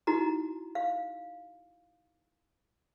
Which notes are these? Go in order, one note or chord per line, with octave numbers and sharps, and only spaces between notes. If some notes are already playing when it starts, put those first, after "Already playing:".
D#4 E4 F#4 A#5
F5